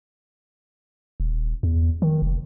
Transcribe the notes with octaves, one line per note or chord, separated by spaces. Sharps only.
D#1
E2
D#3
F1